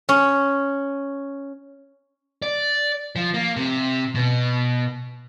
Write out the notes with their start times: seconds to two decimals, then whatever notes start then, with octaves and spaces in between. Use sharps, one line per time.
0.09 C#4
2.42 D5
3.16 F3
3.34 A#3
3.57 C3
4.15 B2